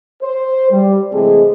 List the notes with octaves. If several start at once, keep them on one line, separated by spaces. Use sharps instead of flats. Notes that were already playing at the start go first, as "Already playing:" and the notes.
C5
G3
C3 E3 G#3 A3 C4 G#4